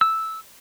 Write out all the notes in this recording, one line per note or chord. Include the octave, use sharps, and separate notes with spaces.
E6